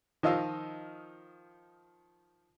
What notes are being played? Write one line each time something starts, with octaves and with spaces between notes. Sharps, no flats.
D#3 F3 D#5 F5 E6